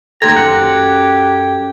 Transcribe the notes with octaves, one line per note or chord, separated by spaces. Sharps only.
D#2 G4 A4 C5 A#5 G#6
F#2 F#5